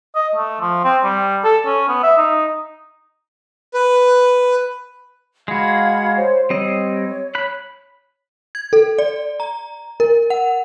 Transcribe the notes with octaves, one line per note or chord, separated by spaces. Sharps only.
D#5
A3
F3
C4
G3
A4
C#4
B3
E5
D#4
B4
G#3 F#4 F5 B5 G#6
C5 C#5
G3 C4 C#5 D#5
B5 F#6
G#6
A4
D5
A#5
A#4
F#5